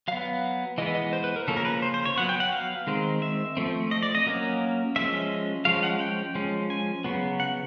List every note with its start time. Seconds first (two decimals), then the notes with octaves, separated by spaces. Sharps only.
0.08 F#3 B3 F5
0.78 E3 G#3 B3 D#5
0.95 D#5
1.13 C5
1.24 B4
1.36 A#4
1.48 C#3 F3 A#3 C#4 A4
1.57 A#4
1.65 B4
1.82 C5
1.94 C5
2.05 C#5
2.17 F#3 B3 F#5
2.29 G5
2.40 F#5
2.52 F5
2.87 D#3 G#3 C4
3.22 E5
3.57 F3 A3 C4
3.91 D#5
4.03 D5
4.15 D#5
4.26 F#3 A#3 C#4
4.96 F3 G#3 C#4 E5
5.65 F3 G#3 C#4 F5
5.83 F#5
6.00 G5
6.35 F3 G#3 C#4
6.70 G#5
7.04 C#3 F#3 B3
7.40 F#5